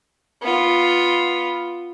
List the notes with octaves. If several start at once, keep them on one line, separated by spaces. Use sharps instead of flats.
B3 F4